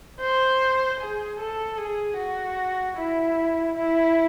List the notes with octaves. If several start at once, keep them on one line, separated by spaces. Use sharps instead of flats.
C5
G#4
A4
G#4
F#4
E4
E4